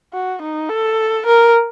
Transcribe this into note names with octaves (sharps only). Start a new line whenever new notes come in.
F#4
D#4
A4
A#4